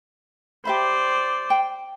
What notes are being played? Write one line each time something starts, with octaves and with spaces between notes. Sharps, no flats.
G4 C5 D5 E5 B5
G5